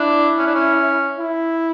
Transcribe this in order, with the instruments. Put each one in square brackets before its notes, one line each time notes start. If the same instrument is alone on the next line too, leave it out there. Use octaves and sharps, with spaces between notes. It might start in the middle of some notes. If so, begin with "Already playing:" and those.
Already playing: [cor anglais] D4 [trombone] E4
[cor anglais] C#4
D4
C#4
[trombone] E4